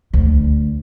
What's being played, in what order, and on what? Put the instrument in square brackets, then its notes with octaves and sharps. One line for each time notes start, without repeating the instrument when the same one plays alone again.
[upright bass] D2